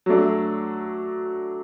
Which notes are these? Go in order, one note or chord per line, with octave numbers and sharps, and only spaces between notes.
F#3 A3 D4